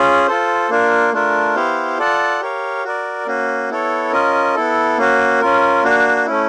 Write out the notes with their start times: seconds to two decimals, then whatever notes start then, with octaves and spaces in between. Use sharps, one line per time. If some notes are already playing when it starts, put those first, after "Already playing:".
Already playing: C#4 F4 G#4
0.27 F4 A4 C5
0.70 A#3 D4 F4 A#4
1.12 A3 D4 F4 A#4
1.55 B3 E4 G4 C5 F5
1.98 F4 A4 D5 F#5 A5
2.41 G4 A#4 C#5 F5
2.84 F#4 A#4 D5
3.27 A#3 C#4 F#4
3.69 B3 E4 A4 C#5
4.12 C#4 F4 A#4 D#5
4.55 B3 E4 A4
4.98 A#3 C#4 F#4
5.40 C#4 F4 A#4
5.83 A#3 D4 F#4
6.26 A3 C#4 E4